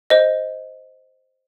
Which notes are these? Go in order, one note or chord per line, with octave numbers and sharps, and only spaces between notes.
C5 D#5